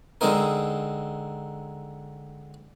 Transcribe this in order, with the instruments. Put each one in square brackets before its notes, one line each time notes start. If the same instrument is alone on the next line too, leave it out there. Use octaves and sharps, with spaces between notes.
[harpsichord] D3 G#3 C4 D#4 A#4